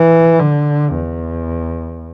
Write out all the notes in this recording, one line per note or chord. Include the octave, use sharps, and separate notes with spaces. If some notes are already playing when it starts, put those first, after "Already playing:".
Already playing: E3
D3
E2